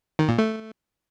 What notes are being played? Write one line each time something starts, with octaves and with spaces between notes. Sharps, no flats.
D#3
A#2
A3